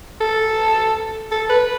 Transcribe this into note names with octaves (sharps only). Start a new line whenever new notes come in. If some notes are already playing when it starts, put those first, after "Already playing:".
A4
A4
B4